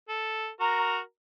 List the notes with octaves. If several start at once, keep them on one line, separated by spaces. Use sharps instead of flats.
A4
F#4 A#4 A#5